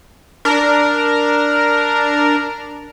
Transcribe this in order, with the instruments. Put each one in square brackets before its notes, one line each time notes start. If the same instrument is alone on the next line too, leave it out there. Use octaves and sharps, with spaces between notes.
[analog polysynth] D4 A#4